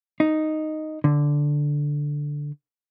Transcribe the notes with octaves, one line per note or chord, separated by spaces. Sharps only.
D#4
D3